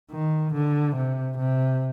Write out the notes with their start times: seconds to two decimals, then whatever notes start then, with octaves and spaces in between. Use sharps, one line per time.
0.12 D#3
0.54 D3
0.96 C3
1.38 C3